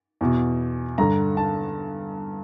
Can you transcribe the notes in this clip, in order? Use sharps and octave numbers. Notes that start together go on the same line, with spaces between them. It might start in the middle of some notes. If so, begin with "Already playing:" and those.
E2 B2
G2 D3 A#5
A5